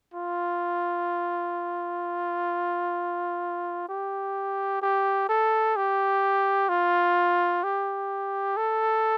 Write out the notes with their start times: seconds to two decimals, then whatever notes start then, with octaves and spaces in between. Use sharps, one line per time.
0.14 F4
3.89 G4
4.82 G4
5.29 A4
5.76 G4
6.69 F4
7.64 G4
8.57 A4